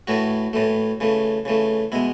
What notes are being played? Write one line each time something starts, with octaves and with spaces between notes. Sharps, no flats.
A2 E3 A3 F#4
A2 E3 A3
C#3 E3 A3
C#3 E3 A3
B2 G#3 E4